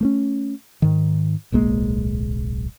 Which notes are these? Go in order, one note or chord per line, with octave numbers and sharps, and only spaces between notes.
A3 A#3 C#4
G#2 D#3
D1 B1 G#3 A#3